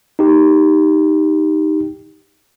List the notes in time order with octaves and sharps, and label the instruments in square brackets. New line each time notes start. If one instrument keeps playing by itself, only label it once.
[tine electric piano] D#4 G4